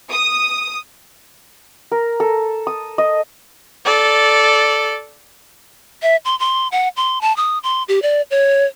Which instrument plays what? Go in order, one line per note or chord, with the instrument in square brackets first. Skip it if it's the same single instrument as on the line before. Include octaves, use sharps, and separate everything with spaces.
[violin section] D#6
[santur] A#4
A4
D#6
D#5
[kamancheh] A4 D5
[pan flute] E5
C6
C6
F#5
C6
A5
D#6
C6
G4
D5
C#5